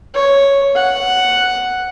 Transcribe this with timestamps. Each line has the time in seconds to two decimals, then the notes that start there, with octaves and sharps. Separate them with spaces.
0.14 C#5
0.75 F#5